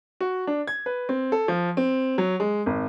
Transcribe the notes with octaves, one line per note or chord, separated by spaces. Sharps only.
F#4
D4
G#6
B4
C4
A4
F3
C4
F#3
G#3
G#1